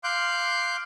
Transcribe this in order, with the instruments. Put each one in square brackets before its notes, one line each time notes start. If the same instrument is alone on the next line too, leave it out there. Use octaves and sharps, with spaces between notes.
[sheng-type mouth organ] F5 C6 D6 F#6 G6